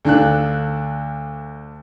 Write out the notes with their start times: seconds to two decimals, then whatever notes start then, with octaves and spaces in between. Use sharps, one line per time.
0.05 D2 D4 A4 F5 F#6